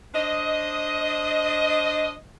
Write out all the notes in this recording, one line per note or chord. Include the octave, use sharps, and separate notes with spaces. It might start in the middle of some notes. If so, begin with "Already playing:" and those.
D4 C5 D#5